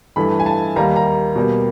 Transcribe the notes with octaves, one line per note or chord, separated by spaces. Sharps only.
G2 E3 A3 B5
G#5
A5
D#2 D#3 G3 A#3 A#5
A#5
B2 G3 A#3